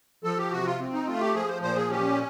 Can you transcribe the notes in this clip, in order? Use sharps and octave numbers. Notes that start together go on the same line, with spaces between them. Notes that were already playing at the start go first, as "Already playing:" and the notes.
F3 A4
G4
C3 F#4
F4
C4
D#4
A3 F4
G4
F3 G#4
C5
A#2 C5
G#4
C#4 G4